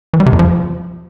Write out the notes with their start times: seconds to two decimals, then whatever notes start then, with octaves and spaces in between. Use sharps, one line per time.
0.13 E3
0.20 G3
0.26 C3
0.33 F2
0.39 F3